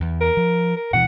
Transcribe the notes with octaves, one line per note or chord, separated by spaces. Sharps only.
E2
A#4
F3
A#4
D1 B2 E3 F#5